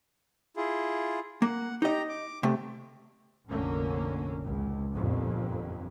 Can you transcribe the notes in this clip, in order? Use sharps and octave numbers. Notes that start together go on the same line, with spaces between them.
E4 F4 G#4
A#3 F#5
D#4 G4 D#5 A#5
D6
C3 A3
F1 A#1 D3 A#3 C#4
G#1 C#2
G1 F2 A#2